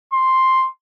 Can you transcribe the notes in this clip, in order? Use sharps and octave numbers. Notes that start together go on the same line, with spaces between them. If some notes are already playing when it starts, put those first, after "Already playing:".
C6